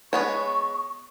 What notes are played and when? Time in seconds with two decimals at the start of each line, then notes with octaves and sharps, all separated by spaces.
0.13 G#3 B3 C#5 C#6